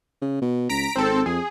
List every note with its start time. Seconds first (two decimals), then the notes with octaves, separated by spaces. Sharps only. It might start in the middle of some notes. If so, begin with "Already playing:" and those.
0.21 C#3
0.41 B2
0.69 C#2 A#5 B6 D7
0.96 G#1 C4 A4
1.26 F2 G#4